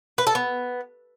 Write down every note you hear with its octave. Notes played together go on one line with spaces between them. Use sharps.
B4
A4
B3